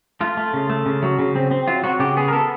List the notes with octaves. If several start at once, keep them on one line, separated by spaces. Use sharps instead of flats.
A3 F4
A3
C#3
A3
C#3
F#3
C#3
C4
C4
F#3 F4
F#3 F#4
C#3 G4
B3 G#4
A#4
B3 A4